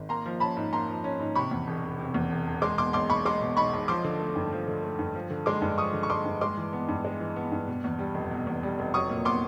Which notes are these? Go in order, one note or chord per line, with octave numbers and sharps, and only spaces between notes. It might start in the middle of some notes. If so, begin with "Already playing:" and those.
Already playing: G#1
A#3 A#5 C6
F3
C#4 A5 B5
G#2
A#3 A#5 C6
F3
C#4
G#2
C3 B5 C#6
E2
E1
E1
C3
E2
E1
E1
G#3 C6 D6
B2 C6 D6
B1 C6 D6
B1 B5 C#6
G#3 C6 D6
B2
B1 B5 C#6
B1
F3 C6 D6
D3
A3
G2
F3
D3
A3
G2
F3
D3
G#3 C6 D6
G2
F3 C#6 D#6
D3
C#6
G#3 C6 D6
G2
G#3 C6 D6
E3
B3
G2
G#3
E3
B3
G2
B2
E2
G3
F1
B2
E2
G3
F1
F#3 C#6 D#6
A#2
B3 C6 D6